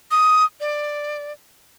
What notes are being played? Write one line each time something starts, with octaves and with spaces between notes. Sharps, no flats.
D#6
D5